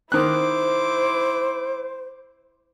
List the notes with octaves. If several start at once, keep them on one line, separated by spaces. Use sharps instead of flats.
D#3 E4 C5 D6 F#6